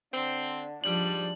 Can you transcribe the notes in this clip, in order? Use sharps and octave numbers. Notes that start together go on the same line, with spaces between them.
D3 C4
G#2 F3 G3 D4 F#7